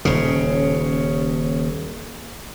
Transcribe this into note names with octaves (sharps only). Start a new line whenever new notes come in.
D#1 C#3